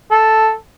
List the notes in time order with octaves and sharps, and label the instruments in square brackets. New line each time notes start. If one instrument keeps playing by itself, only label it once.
[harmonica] A4